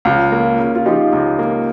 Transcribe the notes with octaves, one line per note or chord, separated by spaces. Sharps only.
C#2 F4
A#3
C#3
F4
F3 D#4 G4
C#2
A#3